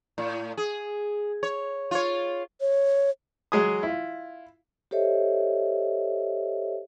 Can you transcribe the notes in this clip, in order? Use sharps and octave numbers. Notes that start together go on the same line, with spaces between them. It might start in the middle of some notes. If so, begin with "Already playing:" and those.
A2
G#4
C#5
F4 C#5
C#5
F#3 G#3 G#4 G#5 D#6
E4 F4
G4 A4 C5 C#5 D#5 E5